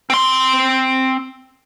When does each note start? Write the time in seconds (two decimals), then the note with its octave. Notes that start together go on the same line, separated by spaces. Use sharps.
0.10 C4 C6